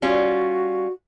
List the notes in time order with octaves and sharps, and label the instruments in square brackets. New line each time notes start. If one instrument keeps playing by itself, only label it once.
[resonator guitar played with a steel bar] G3 C#4 F4 [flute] F#4